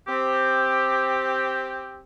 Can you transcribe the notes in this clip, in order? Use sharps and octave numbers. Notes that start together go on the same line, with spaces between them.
C4 G4